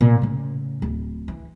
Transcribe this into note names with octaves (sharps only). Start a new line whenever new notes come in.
A#2
A2 C#3
D1
E3